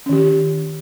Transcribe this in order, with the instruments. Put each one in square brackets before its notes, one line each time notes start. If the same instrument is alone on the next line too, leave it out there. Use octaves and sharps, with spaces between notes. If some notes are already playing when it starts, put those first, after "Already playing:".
[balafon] C#4
D#3
G4